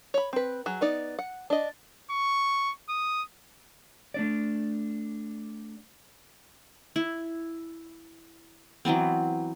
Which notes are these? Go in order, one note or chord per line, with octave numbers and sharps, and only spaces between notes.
C#5 B5
C4 B4
F#3 G#4
B3 D#4 D5
F#5
D4 D#5
C#6
D#6
A3 D4 D5
E4
E3 F#3 B3 C4